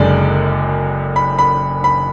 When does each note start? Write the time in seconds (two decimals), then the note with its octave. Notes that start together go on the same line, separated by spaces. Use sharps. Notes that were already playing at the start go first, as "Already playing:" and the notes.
Already playing: F#1 F#2 D3 G#3 D5
1.16 B5
1.39 B5
1.84 B5